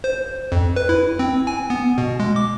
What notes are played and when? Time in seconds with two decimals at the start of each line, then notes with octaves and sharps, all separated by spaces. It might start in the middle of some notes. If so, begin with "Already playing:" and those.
0.04 C5
0.52 F2
0.76 B4
0.89 E4
1.19 C4
1.47 G#5
1.70 B3
1.98 B2
2.20 G#3
2.36 D6